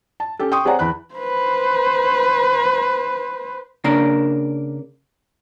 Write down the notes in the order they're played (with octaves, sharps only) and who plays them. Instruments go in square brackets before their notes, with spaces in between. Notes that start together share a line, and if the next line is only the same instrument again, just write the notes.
[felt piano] A5
C#4 G4 A4
G5 C6 C#6 D#6
C4 G#4 C#5 D5 F#5 A#5
E2 B5 F#6
[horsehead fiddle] B4 C5
[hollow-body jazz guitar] C#3 A#3 D4 A#4